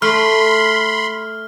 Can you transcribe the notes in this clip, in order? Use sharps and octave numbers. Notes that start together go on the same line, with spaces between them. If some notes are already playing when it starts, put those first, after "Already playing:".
A3 B5 C6 F6